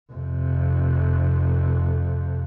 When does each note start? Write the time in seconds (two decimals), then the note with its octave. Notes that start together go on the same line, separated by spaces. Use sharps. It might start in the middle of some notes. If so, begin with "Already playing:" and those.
0.12 F2 C3